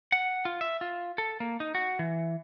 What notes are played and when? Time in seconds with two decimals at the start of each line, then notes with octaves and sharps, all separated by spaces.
0.12 F#5
0.45 F4
0.61 E5
0.81 F4
1.18 A4
1.40 A#3
1.60 D#4
1.75 F#4
1.99 E3